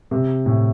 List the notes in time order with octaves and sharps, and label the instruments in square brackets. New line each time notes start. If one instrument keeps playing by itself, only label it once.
[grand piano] C3
A2